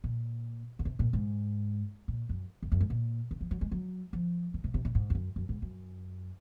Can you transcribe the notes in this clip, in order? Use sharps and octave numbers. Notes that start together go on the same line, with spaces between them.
A#2
C#3
C3
A#2
G#2
A#2
F#2
F2
F#2
G#2
A#2
C#3
F3
F#3
G#3
F#3
F3
C#3
C3
C3
A#2
G#2
F2
F#2
F#2
G#2
F#2